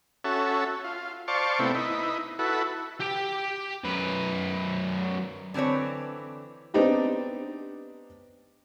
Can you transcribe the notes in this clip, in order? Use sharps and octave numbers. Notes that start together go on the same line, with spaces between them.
C#4 F#4 A4 E5
F4
C5 D5 F5 A5 C#6
C3 A3 B3 C4 E4
D#4 E4 B4
E4 F#4 A4 B4
G4 G5
F#2 B4
D3 E3 C4 B4 C#5
B3 C4 D4 D#4 G4